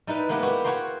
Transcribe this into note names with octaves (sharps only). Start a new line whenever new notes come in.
G3 D#4 E4 B4
G#3 A#3 B3 E4 G4 B4
F#4 G4
F#4 C#5 G5 A#5 C6